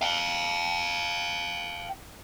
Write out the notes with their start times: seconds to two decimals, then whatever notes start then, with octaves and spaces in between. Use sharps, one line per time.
0.01 F5 G5